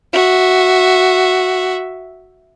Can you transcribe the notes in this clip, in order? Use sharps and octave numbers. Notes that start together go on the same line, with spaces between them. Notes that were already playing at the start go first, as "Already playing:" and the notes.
F#4 E5